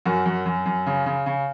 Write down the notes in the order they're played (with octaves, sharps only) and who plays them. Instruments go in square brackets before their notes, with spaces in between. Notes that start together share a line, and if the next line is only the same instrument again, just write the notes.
[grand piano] F#2 F#4 A#4
F#2
F#2
F#2
C#3
C#3
C#3